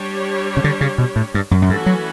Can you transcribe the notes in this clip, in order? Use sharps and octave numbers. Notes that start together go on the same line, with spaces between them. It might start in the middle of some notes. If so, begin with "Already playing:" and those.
Already playing: G3 D4 G4 C#5
C#3
D3
C#3
B2
A2
G2
F#2
F#2
G2 E3 A3 C#4 F#4 A4
F#3